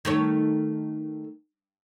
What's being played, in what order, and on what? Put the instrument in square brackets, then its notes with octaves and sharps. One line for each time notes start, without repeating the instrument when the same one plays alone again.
[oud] D#3 A3 C#5